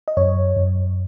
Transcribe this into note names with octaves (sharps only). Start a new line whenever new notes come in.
D#5
F#2 C#5
F#2